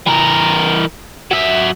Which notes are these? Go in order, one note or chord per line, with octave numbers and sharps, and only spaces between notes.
E3 A#4
F#3 E5